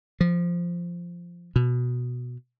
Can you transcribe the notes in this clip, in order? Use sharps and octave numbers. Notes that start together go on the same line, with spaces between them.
F3
B2